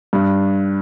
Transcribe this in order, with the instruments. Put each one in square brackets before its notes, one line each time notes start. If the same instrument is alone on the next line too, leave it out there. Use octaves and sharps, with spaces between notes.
[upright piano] G2